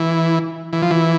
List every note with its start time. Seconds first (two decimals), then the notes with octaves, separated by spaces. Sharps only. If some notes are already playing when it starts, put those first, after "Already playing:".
Already playing: E3
0.73 E3
0.82 F3
0.90 E3